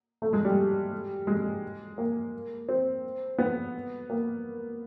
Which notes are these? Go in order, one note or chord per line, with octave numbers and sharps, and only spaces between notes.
A3
G#3
G3
G#3
A#3
C4
B3
A#3